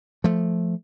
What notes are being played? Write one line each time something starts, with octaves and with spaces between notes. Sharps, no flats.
F3 A3